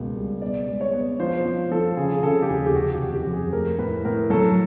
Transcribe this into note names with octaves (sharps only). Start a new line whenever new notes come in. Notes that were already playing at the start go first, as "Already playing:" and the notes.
Already playing: C#2 B2 A#3
G3
B3 D5
G#3
C#5
B3
F3 C5
F3
F3 A4
C#3 G#4
G#4
C#3 A4
G4
D#2 G#4
G4
C3 F#4
G4
F2
G4
F2
G#4
A3 A#4
A2 B4
A2 A#4
F#3 A4